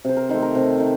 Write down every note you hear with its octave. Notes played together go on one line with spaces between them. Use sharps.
C3 C5
A#4
D#3 A3 C5
A#4
C3
D#3